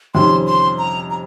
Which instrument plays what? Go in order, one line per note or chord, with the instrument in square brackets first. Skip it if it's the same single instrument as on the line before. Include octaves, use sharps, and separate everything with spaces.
[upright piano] F2 C3 D#3 G3 C#4 [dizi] C6
[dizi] C6
A#5
A#5